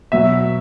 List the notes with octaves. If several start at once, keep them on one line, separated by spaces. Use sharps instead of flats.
B2 F#3 E5